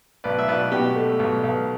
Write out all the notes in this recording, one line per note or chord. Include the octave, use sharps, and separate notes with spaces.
B1 B4 D5
E5
B1 B4 D5
B2 G4
A3
B1
B1